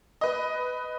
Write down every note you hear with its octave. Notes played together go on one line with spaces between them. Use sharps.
B4 D#5